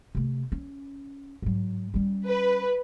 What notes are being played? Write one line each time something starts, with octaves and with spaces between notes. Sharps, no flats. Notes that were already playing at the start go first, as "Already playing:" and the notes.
C3 A3
C#4
G#2 F#3
G3 C#4
B4